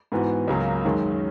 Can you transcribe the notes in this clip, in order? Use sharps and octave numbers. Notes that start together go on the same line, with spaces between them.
G#2 E3 B3 F#4
C#2 C#3 F#3 A#3
F#2 D#3 G#3 C#4